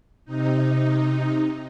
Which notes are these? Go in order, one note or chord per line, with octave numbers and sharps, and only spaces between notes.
C3 D#4